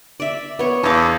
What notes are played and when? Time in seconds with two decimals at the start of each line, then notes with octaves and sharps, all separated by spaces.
0.20 D5 E5
0.59 B3 C#5
0.83 E2 F5 A5